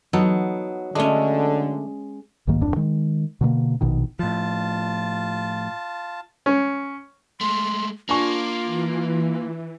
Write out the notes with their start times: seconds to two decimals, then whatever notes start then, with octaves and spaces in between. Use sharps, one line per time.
0.13 F#3 B3 D#4 A4
0.95 D3 G#3 A3 C#4 D4
2.47 B1 G#2 D#3 A#3
2.61 D1 F2 D4
2.76 D#3 G#3
3.41 B2 D3 A3 A#3
3.81 A#1 B2 D#3
4.19 A2 F3 F4 A5
6.46 C#4
7.41 G#3 A3 C6
8.09 A#3 D4 F4 G#5 C#6 D6
8.64 E3